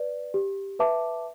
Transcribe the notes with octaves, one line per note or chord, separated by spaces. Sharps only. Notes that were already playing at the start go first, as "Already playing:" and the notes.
Already playing: B4 D5
G4
B4 E5 A5 D6